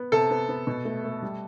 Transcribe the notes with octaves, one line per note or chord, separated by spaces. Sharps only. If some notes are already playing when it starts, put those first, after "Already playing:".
Already playing: B3
C3 A4
B3
B3
B2
A3
A3
G3